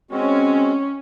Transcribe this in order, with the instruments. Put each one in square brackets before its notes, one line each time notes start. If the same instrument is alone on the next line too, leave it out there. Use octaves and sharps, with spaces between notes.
[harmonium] G#3 C4 F#4 [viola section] C#4